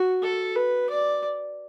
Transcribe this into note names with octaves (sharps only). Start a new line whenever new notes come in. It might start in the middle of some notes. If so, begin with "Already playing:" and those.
Already playing: F#4
A4
B4
D5